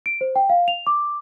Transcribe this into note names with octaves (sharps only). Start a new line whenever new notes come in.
D7
C5
G5
F5
F7
D6